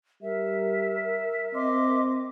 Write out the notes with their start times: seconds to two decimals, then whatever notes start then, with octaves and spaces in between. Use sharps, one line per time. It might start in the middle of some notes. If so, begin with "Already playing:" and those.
0.22 G3 A#4 E5
1.54 C4 D#5 C6 D6